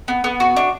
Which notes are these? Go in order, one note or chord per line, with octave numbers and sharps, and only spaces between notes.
B3
B3
F#4
D4